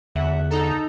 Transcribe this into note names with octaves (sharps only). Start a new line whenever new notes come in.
E2 D3 E5 F#5
D#4 A4 A#5